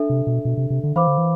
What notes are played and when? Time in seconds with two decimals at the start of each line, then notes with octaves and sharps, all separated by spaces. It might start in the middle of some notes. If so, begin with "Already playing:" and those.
Already playing: D4 A4 E5
0.10 C3
0.27 B2
0.45 B2
0.57 C3
0.70 C3
0.83 D3
0.96 E3 C5 F5 B5 D6
1.07 D3
1.18 E3